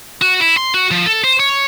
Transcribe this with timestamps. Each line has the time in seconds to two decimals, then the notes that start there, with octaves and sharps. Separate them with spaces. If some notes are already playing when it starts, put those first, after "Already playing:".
0.22 F#4
0.40 E4
0.57 C6
0.74 F#4
0.91 F3
1.06 A4
1.24 C5
1.40 C#5